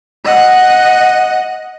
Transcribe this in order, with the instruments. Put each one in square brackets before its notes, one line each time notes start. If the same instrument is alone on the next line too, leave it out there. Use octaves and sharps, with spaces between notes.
[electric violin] D#5 F#5